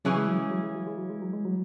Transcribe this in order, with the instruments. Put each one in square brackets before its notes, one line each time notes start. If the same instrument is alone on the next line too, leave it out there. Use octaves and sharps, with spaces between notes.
[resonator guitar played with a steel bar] C#3 E3 C#4 G#4 [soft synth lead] F#3
[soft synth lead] G#3
F#3
G#3
F#3
G#3
F#3
G#3
F#3
G#3
F#3
G#3
F#3